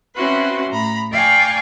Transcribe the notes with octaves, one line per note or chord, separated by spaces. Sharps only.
C4 C#4 E4 F#4 B4 C6
A2 A#5 B5
D5 F5 G5 G#5 A#5 C#6